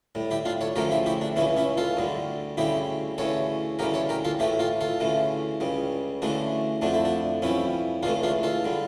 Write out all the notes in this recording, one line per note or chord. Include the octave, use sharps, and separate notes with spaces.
A2 G3
E4 G4
D4 F4
A4 C#5
D2 C#3 F3 A3 G4 A#4
E4 G4
E4 G4
D4
C#2 C#3 E3 C#4 E4
C#4 E4
F4 A4
D2 D3 G3
D2 C#3 G3 E4 G4
D2 C#3 E3 A4 C#5
D2 C#3 E3 G3 G4 A#4
A4 C#5
G4 A#4
F4 A4
A2 E3 A3 E4 G4
F4 A4
F4 A4
D2 C#3 E3 A3
C#2 C#3 G3
D2 C#3 E3 A3 D4
F2 D3 A3 D4
E4
D4
F2 E3 G3 C#4 E4
C#2 C#3 E3 A3 D4 F4
D4 F4
F4 A4
D3 G3